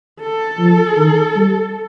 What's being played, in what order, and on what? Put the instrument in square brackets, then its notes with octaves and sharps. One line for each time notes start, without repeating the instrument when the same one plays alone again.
[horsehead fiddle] A4
[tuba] F3
D#3
G3